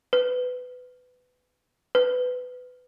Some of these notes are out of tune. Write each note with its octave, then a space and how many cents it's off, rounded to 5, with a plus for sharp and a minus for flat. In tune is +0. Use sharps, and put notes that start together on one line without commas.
B4 +20
B4 +20